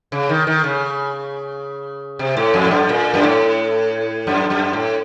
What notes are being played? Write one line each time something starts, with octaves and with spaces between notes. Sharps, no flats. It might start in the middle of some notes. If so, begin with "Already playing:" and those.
C#3
D#3
D#3
C#3
C3
A2
F2
A2
F#2
A#2
F#2
A2
F#2
F#2
A2